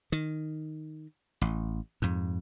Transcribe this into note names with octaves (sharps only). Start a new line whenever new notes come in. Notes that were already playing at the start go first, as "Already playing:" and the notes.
D#3
A1
F2 G#2